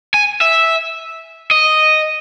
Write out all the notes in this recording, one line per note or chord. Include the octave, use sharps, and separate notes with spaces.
G#5
E5
D#5